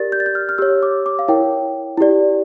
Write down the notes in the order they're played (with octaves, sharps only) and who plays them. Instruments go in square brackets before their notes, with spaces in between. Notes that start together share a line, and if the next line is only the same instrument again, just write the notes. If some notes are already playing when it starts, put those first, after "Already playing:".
Already playing: [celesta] G4 A#4 D5 A6
G6
A6
G6
F6
F6
G4 C#5 E6
D6
D6
F5
E4 A#4 C#5 G5
E4 G4 D5